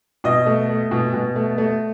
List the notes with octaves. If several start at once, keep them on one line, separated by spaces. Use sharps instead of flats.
B2 D#5
A3
A3
B2
B2
A3
A3